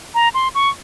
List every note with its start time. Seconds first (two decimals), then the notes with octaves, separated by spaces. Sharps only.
0.15 A#5
0.34 C6
0.55 C#6